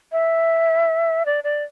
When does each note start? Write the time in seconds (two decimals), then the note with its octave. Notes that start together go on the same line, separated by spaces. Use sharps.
0.12 E5
1.26 D5
1.44 D5